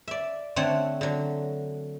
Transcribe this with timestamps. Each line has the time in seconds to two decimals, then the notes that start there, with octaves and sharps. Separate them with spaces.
0.08 D5 E5
0.56 D3 A3 C4 C#5 F#5 A5
1.01 D3 F#3